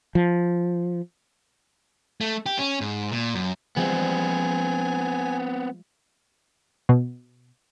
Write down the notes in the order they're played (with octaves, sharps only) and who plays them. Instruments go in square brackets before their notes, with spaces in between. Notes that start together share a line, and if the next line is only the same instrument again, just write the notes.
[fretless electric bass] F3
[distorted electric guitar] A3
G4
C#4
G#2
A#2
F#2
[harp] F3 G3 G#3 [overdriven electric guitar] B3 C4 [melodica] G#5
[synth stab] B2